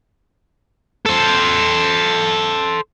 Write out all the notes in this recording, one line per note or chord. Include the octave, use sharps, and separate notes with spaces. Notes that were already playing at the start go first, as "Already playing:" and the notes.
A4 C5